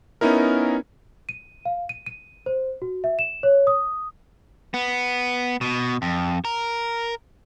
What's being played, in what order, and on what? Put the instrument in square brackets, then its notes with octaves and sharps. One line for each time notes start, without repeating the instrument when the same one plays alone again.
[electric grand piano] B3 C#4 D#4 E4 A#4
[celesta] D#7
F5
D#7
D#7
C5
F#4
E5
E7
C#5
D#6
[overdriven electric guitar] B3
B2
F2
A#4